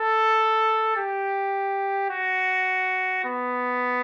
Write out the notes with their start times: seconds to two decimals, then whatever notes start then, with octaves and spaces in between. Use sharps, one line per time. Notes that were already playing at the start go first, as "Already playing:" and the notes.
Already playing: A4
0.97 G4
2.10 F#4
3.25 B3